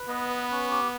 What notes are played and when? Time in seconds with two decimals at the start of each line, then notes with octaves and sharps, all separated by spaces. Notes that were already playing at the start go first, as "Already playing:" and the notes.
Already playing: B4
0.09 B3 D#5
0.30 B4
0.51 C#4
0.71 G4